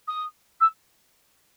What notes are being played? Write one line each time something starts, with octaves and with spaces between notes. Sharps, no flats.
D#6
E6